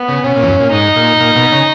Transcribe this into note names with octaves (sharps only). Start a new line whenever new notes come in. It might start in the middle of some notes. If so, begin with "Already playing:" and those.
Already playing: B3
C#3
B2 C#4
A#2
E2
F#2
A#2
G#2 D#4
A#2
A#2
B2
C#3